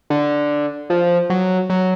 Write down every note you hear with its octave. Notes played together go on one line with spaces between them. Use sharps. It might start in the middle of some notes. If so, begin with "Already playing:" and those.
D3
F3
F#3
F#3